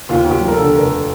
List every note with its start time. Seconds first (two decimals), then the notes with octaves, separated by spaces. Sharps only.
0.09 D#2 F4
0.25 D#2
0.31 G4
0.41 F3
0.47 A#4
0.53 D3 A4
0.75 F1 A#4